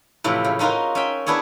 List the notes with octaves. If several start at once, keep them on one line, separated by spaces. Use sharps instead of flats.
A2 C3 E3 F3
C#3
C#4 D#4 F4 F#4 A#4
C#4 E5 G5
B3 D4 E4 G#4 C#5